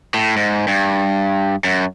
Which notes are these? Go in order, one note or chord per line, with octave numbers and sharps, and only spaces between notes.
A2
G#2
G2
F#2